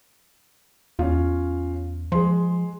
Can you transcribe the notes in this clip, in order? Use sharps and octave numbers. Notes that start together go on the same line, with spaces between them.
E2 C#4 F4
F3 G#3 C6